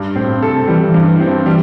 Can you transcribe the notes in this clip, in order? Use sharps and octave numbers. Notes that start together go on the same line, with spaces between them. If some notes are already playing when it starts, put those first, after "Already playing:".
Already playing: G2
A2 C4
C3 A4
E3 G3
E3
G2
C4
E3 G3